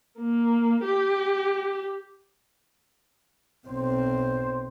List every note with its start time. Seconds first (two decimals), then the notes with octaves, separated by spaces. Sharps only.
0.18 A#3
0.84 G4
3.68 B1 C4 C5